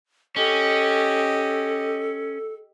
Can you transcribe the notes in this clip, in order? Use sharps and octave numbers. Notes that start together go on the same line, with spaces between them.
C#4 G4 A4 D#5